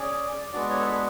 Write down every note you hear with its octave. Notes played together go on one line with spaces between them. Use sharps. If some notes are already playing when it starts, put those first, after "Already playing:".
Already playing: C#4 G#4 D5
G#3 B3 D4 F#4 D5
C#5
A4
B4